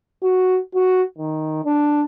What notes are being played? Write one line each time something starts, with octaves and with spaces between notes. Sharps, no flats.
F#4
F#4
D#3
D4